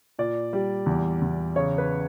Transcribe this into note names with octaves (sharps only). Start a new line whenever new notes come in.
A#2 D5
G3
E2
E2
C#3 C#5
B4